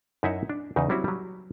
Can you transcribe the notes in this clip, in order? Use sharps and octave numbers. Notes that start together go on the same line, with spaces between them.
F#2 D#4 E4 E5 F#5
D4
E2 C#3 D#4
F#3 G3 C4 C#4 E4 F#4
F#3 G3